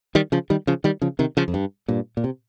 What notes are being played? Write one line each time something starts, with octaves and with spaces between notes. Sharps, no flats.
D#3 G3
C#3 F3
D#3 G3
C#3 F3
D#3 G3
C#3 F3
C3 D#3
C#3 F3
F2
G2
G2 A#2
A#2
C3